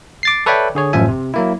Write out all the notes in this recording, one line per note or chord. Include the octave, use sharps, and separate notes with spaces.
D6 A6 C7
A4 B4 C#5 D5 E5 G5
D3 G#4 C#5
A1 F#2 F3 E5 G#5
C3
F#3 A#3 E4